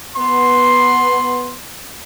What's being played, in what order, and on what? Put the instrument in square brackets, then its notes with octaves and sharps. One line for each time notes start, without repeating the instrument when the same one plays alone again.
[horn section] B3 C6